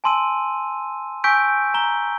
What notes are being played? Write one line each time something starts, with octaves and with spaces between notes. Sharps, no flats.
G#5 A5 C6 E6 D#7
G#5 C#6 E6 G6 B6 D7
A#5 G7